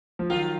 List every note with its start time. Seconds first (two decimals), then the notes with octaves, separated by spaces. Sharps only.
0.19 F3
0.30 D#3 F#3 F4